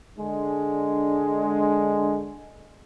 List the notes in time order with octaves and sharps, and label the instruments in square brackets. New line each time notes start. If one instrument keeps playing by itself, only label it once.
[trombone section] D3 G#3 [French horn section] D4